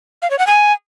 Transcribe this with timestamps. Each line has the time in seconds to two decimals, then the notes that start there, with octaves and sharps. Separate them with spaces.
0.22 F5
0.31 C#5
0.39 F#5
0.47 G#5